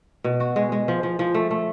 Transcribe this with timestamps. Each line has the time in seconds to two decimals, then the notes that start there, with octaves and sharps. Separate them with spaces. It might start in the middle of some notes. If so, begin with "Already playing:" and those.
0.24 B2
0.40 F#4
0.56 G#3
0.72 G#3
0.88 F3
1.03 F3
1.19 F3
1.35 A3
1.51 A3